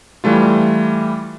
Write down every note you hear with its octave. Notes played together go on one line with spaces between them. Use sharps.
E3 G3 A3 F4